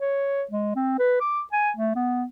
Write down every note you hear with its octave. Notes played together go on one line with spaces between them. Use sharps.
C#5
G#3
C4
B4
D6
G#5
A3
B3